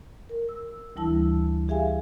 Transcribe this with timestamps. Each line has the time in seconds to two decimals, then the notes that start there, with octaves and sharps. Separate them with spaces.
0.29 A#4
0.49 E6
0.96 D2 E3 G3 E4 A5 E6
1.68 G4 G#4 E5 F5 G#5